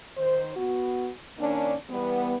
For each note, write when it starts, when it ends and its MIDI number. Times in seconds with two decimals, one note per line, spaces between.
0.17 0.51 51
0.17 0.51 72
0.56 1.10 59
0.56 1.10 66
1.38 1.75 51
1.38 1.75 58
1.38 1.75 61
1.38 1.75 62
1.90 2.35 52
1.90 2.35 55
1.90 2.35 59